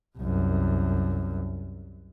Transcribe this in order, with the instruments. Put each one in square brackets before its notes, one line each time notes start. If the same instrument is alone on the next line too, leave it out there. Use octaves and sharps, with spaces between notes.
[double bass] C2 F#2